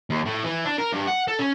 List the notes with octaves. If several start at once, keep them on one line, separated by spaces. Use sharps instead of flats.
D#2
A2
E3
D4
A#4
G2
F#5
A4
C#4